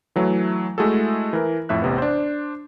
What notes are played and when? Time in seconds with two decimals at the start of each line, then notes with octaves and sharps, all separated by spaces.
0.16 E3 F#3 A3
0.78 G#3 A3 E4 F#4 G#4 A4
1.33 E3 A#4
1.69 F2 A2 E5 F#6
1.82 A1 C3 B3
1.98 D4 C5